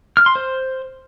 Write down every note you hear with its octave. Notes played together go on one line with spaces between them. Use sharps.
F6
C6
C5